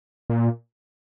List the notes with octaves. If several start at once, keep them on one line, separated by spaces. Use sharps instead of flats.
A#2